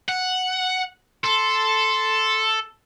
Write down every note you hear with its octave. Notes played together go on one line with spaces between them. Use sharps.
F#5
A4 C6